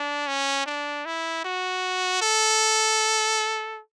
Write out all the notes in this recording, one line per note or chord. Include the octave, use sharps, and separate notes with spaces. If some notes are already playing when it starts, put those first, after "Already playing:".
Already playing: D4
C#4
D4
E4
F#4
A4